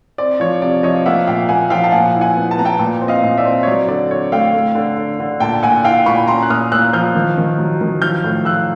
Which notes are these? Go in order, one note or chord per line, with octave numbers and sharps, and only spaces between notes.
C4 D5
F3 C#5
C3 D5
F3 C#5 D#5
A#3 E5 F#5
A#2 F5 G5
A#3 F#5 G#5
F3 F5 G5
A5
A#2 F#5 G#5
E4
F#5 G#5
B3
A5
B3 A#5
G5 A5
A#2
C4
D#5 F5
A#2
D5 E5
C4
C#5
F#3 D5
D3 D5
C4 C#5
A3 F5 G5
A3
D3
D3
D3
A#2 G5 A5
A#2 F#5 G#5
E4 F5 G5
A#2 B5 C#6
C#4 A#5 C6
F#6
A#2 D#6 F6
A#3 E6 F#6
F3 F6 G6
D#3
D#3
F#3
D#3
F3 F6 G6
A2
F3 E6 F#6